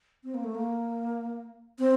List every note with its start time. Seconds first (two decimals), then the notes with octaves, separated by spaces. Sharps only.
0.24 C4
0.34 A#3
0.44 A3
0.55 A#3
1.79 C4